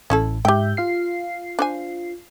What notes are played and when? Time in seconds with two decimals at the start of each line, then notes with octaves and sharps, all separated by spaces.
0.10 A1 C#4 E4 A4
0.45 G#2 G4 E5 G5 G6
0.77 F4 F5 C7
1.59 D4 C5 G#5